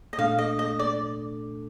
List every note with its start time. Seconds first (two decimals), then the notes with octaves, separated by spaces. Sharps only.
0.13 D#5
0.18 A#2 A3 D4 A4 F5
0.39 D#5
0.59 D#5
0.79 D5